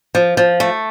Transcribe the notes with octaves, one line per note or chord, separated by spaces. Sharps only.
F3
F3
A3